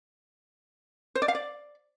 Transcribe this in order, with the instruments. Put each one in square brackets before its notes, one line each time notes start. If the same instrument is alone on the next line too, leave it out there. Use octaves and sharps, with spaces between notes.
[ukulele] C5
D5
F5
D5